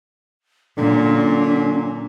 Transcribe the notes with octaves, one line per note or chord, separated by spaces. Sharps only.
A#2 D3 F#3 C#4